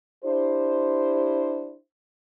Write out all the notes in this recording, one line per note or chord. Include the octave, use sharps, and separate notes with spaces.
D4 E4 G4 C5